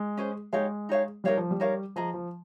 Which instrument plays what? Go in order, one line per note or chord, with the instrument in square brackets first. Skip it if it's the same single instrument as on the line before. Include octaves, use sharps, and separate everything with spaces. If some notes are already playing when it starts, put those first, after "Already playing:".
Already playing: [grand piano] G#3
[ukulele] C#4 G#4 C5
[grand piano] G#3 [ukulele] D#4 G4 C#5 F5
[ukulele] D#4 G4 C#5 F5
[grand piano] G3 [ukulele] D#4 A#4 C#5 F5
[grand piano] F3
G3
[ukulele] D#4 A#4 C#5 F5
[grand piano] F3 [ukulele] G#4 D#5 A#5
[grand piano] F3